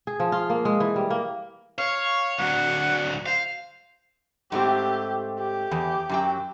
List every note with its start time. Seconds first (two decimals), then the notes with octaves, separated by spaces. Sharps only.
0.07 G#4
0.20 F3
0.32 F4
0.50 A#3
0.65 G#3
0.80 E3
0.96 G3
1.10 A#3
1.78 C#5 F5
2.38 D2 F#3 F#5
3.26 C5 F5
4.52 G#2 A3 C4 G4
5.39 G4
5.71 E2
6.09 F#2 F#3 G5